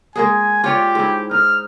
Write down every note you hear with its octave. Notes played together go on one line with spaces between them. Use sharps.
G#3 A#3 G#4 G#5
F4 G4 C#5 D5
G#2 E4
D#4 F6